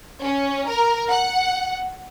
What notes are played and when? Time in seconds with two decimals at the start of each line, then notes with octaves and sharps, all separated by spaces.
0.22 C#4
0.68 A#4
1.09 F#5